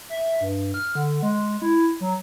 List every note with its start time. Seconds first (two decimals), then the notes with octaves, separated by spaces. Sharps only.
0.10 E5
0.41 G2
0.74 F6
0.95 D3
1.23 G#3
1.62 E4
2.00 F#3